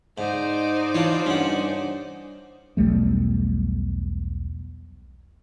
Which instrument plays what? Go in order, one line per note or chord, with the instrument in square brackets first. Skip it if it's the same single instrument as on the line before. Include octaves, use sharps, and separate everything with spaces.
[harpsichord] G#2 [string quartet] D#4 C5 D5
[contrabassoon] E3 [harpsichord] D4 F4 C#5
[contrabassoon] G2 [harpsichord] C#4 F#5
[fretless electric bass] B1 E2 G3 A3